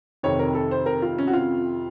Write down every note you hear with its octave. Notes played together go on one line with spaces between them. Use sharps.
F2 C3 D#3 C#5
A#4
A4
C5
A#4
F4
C#4
F#4
F4